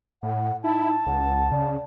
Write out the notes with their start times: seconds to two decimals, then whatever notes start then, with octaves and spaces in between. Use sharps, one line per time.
0.23 A2 F#5
0.64 D#4 E4 A5
1.06 C#2 F#5
1.52 C#3 D5